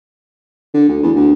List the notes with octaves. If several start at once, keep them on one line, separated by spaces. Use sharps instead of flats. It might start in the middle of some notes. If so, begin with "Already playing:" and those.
D3
D2
E2
D2